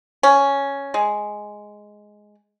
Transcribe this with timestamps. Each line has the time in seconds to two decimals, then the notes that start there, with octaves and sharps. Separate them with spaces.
0.23 C#4
0.94 G#3